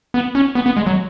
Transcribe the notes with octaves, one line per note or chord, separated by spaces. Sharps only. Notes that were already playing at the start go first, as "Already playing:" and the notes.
B3
C#4
B3
B3
G#3
F#3